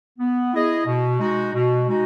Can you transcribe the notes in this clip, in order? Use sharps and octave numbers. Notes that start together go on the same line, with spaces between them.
B3
E4 G#4 D#5
B2
G#3 D#4 F#4
B2
G#3 D#4 F#4